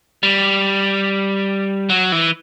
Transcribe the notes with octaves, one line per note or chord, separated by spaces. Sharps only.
G3
F#3
E3